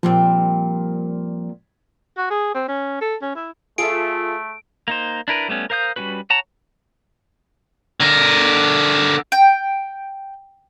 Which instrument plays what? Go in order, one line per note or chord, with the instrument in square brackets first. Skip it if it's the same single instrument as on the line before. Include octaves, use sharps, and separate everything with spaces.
[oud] A#2 G3 C4 [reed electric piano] F3
[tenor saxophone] F#4
G#4
C4
C#4
A4
C#4
E4
[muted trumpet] A3 [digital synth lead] F4 [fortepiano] G#4 A4 E5 [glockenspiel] D7
[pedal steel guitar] A#3 D#4 C5
D4 E4 A#4 B4
G3 A3 B3 C#4
A#4 C5 F5 D#6 G6
G3 C4 C#4 F#4 B4
C#5 F#5 A5 A#5
[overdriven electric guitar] D3 A#4
[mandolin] G5